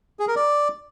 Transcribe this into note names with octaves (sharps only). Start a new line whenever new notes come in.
G#4
A#4
D5